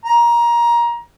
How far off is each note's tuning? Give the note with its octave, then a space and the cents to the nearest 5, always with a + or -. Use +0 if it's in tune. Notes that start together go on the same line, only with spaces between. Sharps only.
A#5 +20